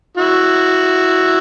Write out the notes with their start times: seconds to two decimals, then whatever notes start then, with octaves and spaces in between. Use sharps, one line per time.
0.17 E4 F#4